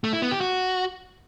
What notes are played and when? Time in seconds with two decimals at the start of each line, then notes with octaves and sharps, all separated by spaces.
0.04 A3
0.13 E4
0.22 B3
0.31 G4
0.41 F#4